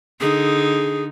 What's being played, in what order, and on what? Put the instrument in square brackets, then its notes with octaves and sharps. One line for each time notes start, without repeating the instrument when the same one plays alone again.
[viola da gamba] D3 D#4 [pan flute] G#4